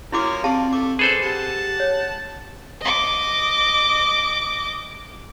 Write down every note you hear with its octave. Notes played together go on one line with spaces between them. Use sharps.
F3 A#3 C#4 E4 F#4 D6
C4 F4 G4 D5 F5 A5
A3 D6
D3 G#4 A4 B4 C5
G4 F#5 A5
C#5
D#5 D6